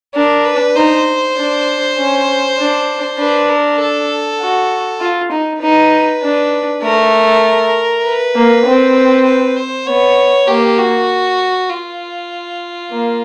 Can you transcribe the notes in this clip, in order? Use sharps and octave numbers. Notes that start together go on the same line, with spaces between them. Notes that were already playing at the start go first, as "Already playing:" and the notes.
D4 A#4
B4
D#4 C5
D4
C#4
D4
D4 B4
A#4
A4
F#4
F4
D#4
D#4 B4
D4
A3 A#4
B4
A#3
C4
B4
C5
B3 C#5
A#3 G4
F#4
F4
A#3